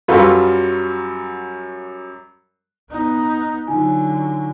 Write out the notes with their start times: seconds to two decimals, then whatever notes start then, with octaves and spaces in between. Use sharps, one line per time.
0.08 F#2 F#3 G3 F4 A4 B4
2.90 B3 D#4
3.67 D3 F#3 D#4 F4 G#5